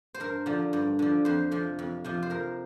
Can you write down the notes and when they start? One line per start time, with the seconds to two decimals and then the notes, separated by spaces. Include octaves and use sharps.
0.14 C5
0.20 G2 A#4
0.46 D3 F3
0.73 G2
0.99 D3 F3
1.25 F2 C5
1.51 C3 F3
1.79 F2
2.04 C3 F3
2.23 C5
2.30 F2 A#4